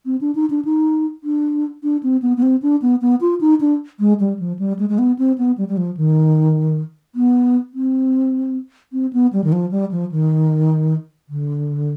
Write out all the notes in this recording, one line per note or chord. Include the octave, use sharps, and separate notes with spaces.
C4
D4
D#4
D4
D#4
D4
D4
C4
B3
B3
C4
D4
B3
B3
F4
D#4
D4
G#3
G3
F3
G3
G#3
G#3
B3
C4
B3
G3
G3
F3
D#3
B3
C4
C4
B3
G3
D#3
F3
G3
F3
D#3
D3